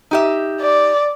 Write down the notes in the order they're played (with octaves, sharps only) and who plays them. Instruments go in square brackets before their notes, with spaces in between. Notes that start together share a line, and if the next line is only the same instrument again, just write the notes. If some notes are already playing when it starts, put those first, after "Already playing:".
[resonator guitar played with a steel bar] D#4 G4 E5
[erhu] D5